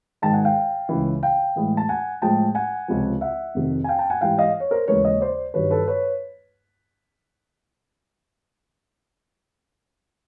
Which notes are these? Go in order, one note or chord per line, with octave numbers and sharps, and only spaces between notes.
G#2 D#3 G#3 G5 A5
F#5 G#5
F5 G5
C#2 C#3 E3
F5 G5
A2 E3 G#3
A5
F#5 G#5
A2 F3 G#3 G5 A5
F#5 G#5
C#2 C3 F3
E5 F#5
F2 C3 D#3
G#5
F5 G5
G5 A5
F#5 G#5
G#2 E3 G3 F5 G5
D#5 F5
C#5
A#4 C5
D#2 C#3 E3 G#3 B4 C#5
C#5 D#5
C5 D5
G2 D#3 F#3 B4 C#5
A4 B4
B4 C#5